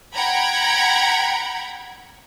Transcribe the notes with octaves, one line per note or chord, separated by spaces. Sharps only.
F#5 G5 A#5 B5 G#6